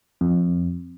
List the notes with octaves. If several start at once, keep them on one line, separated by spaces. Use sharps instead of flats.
F2